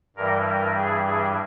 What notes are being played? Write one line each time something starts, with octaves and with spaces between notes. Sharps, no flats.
G2 E3 G3 A#4
A#4
G#4
G#4